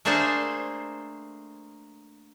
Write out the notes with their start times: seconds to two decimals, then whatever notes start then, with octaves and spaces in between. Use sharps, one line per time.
0.05 A3 A#3 D4 G#4 A4 C5